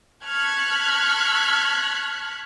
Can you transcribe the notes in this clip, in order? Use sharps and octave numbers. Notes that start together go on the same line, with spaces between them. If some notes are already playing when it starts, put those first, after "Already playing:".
A5 C#6 F6 F#6 G#6 B6